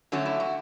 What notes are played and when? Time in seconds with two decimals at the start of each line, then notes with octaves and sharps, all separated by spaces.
0.12 D3 F#3 A3 C#4 F#4
0.25 E4
0.40 F#4